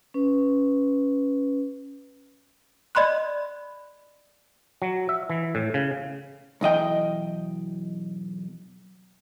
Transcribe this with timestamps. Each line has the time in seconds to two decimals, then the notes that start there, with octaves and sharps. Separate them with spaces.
0.14 C#4 B4
2.95 D5 D#5 B5 C6 F#6
4.82 F#3
5.09 E5
5.30 E3
5.55 A2
5.74 C#3
6.61 B1 E2 D#5 G5